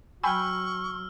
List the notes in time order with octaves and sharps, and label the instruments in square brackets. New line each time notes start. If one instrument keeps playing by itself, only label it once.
[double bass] F#3 [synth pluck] G5 G#5 B5 [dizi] C#6 [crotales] E6 F6